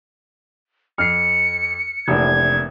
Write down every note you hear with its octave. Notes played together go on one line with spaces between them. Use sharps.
F2 F6 C7 C#7
F1 C3 E3 A#3 D4 G#6